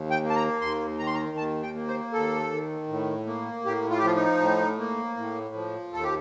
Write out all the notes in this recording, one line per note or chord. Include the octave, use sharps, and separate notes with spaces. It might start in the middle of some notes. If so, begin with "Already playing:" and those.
Already playing: D#2
G5
A#3
A5
A#5
D#2 C6
D#3 A#5
C6
A#5
D#2 A5
G5
A#3
C5
D#2 A4
D#3
A2
A#3
A2 G4
F4
G4
F3 F4
D#4
A2
A#3
A2
F3
D#2 A4
G4